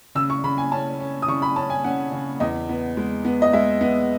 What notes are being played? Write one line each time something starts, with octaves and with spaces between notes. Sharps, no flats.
C#3 E6
C#6
C#3 B5
G#5
C#4 A5
C#4
D#6
C#3 C#6
B5
C#4 A5
G#5
C#4 F#5
C#3
E2 D#5
B3
G#3
B3
D#5
G#3 E5
B3